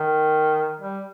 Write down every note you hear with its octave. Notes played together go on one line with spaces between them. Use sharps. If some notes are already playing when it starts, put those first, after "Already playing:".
Already playing: D#3
G3